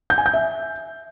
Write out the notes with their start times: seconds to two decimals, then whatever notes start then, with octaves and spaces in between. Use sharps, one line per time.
0.10 G6
0.18 G#5
0.26 G6
0.34 E5